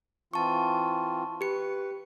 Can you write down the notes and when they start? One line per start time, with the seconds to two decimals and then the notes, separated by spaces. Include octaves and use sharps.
0.33 E3 C4 F4 A5 C#6
1.41 G4 B4 C#7